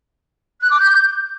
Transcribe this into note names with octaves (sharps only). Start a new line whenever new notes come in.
F#6
D6
G6